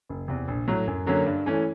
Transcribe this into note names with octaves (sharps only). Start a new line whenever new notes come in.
F#1
E2 C3
A#1
A2 F#3 A3
F#2
D3 F#3 A#3 C#4
G2
E3 A3 C#4